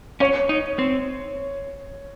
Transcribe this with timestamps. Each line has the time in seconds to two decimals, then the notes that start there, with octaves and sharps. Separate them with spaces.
0.20 C#4 C#5
0.49 D#4
0.79 C4